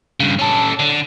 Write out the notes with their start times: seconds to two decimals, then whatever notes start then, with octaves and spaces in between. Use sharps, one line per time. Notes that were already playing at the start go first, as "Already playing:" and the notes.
0.20 G2 C#3
0.39 C#4 A4
0.79 D3